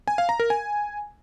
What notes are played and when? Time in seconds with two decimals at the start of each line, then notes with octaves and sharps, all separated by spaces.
0.08 G#5
0.18 F5
0.29 A#5
0.40 A#4
0.50 G#5